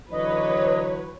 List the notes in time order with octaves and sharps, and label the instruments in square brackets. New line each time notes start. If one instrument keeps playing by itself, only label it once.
[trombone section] D3 E3 F#3 [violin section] B4 C#5 [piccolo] D#5